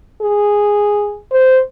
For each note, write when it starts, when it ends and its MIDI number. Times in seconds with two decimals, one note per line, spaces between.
0.21 1.16 68
1.31 1.59 72